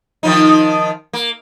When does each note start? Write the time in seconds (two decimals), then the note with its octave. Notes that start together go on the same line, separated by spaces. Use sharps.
0.23 D#3 F3 D#4
1.13 A#3